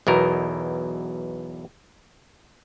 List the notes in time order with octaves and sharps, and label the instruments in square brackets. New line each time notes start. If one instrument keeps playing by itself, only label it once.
[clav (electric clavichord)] B1 E2 B2 A#4